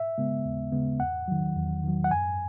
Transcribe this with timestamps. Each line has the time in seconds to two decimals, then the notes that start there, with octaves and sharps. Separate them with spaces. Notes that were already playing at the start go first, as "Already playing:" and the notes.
Already playing: E5
0.18 C#3 G#3 B3
0.45 D#2
0.72 C#3 G#3 B3
1.00 E2 F#5
1.28 D#3 F#3
1.56 E2
1.83 D#3 F#3
2.04 F#5
2.11 F#2 G#5